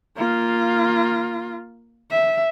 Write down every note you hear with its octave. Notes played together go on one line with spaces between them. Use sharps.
A#3 F4
E5